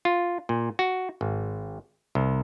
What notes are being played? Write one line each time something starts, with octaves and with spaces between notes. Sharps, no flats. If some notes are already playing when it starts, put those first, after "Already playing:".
F4
A#2
F#4
G#1
C2